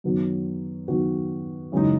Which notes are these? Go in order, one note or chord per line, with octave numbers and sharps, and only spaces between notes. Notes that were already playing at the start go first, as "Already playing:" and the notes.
F#2 D#3 F#3 B3 F#4
F#2 D#3 F#3 B3 F#4
F#2 C#3 E3 G#3 D#4